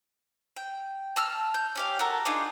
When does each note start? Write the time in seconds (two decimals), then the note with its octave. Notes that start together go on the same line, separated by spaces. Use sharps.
0.56 G5
1.16 A5 E6 F6
1.54 G6
1.75 C#4 G4 F5
1.99 F#4 A4 A#4
2.25 D4 D#4 F4 G#4